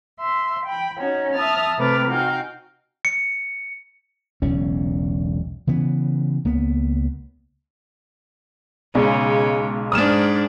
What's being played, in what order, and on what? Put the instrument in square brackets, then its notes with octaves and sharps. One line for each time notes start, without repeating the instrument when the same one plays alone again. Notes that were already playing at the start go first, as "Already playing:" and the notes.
[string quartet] E5 C6
G5 B5
C#4 D#4 F#4
E5 A5 D#6 F6 A6
C3 A3 B4 D6 F6 A6
D#4 F#4 F5 G5 G#5
[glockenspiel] C#7
[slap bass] E1 B1 C#3 C#4
C#3 E3 B3
C#2 A#3 B3
[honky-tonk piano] B1 G#3 [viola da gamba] C#3
[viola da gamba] G#2 D4 [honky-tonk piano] D#6 F6 E7